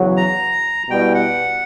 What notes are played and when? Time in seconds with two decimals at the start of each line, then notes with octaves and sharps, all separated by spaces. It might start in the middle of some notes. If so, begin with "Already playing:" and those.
Already playing: E2 C#3 F#3
0.17 A#5
0.89 B2 G3 B3 E4 G5
1.15 F#5